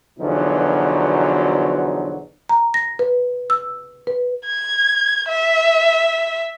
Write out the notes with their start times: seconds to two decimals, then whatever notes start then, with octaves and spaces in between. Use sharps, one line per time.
0.19 E2 B2 D3 F3 F#3 D#4
2.49 A#5
2.74 A#6
2.99 B4
3.50 E6
4.07 B4
4.47 G#6
5.28 E5